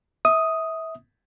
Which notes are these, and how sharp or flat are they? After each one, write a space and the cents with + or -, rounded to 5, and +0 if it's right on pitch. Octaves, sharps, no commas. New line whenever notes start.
E5 -30 D#6 +0